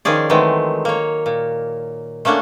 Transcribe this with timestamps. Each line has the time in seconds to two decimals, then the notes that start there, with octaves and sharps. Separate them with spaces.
0.05 D#3 F3 C#4 G#4 D5
0.30 D#3 E3 F#3 G#3 A3 C4
0.85 A#3 C#5
1.26 A#2
2.25 A3 A#3 C#4 D4 F#5